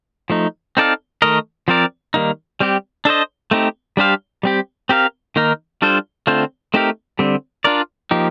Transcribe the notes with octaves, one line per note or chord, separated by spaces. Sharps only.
F3 A3 D#4
C4 D#4 A4 D5 F5
D#3 A3 D#4 A#4 D#5
F3 C4 F4 A#4 D5
D#3 G3 A#3 D#4
G3 C4 G4
D4 A4 C5 D#5
A3 C4 D#4 G4
G3 D4 G4 C5 F5
G3 C4 G4
C4 G4 A#4 F5
D#3 A#3 D#4 A#4
G3 D4 F4 A4 C5
D3 A3 C4 F4 C5
A3 C4 D#4 G4 A#4
D3 G3 C4
D4 F4 A#4 D5
F3 A#3 D#4 G4